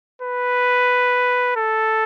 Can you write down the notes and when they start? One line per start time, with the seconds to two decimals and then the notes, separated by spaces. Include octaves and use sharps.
0.22 B4
1.56 A4